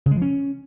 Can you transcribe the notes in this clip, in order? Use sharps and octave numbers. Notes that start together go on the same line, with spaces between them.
C#3
G#3
F3
C#4